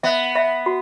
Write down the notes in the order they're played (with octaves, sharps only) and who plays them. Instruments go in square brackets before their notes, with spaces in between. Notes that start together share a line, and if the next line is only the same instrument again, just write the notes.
[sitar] B3 [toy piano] E5
[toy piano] E5
F#4